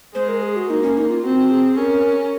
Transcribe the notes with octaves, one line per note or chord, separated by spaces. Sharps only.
G#3 C5
A#4
G#4
F#4
A#3 D#4
C#4
D#4
F4
C4 F#4
G#4
C#4 A#4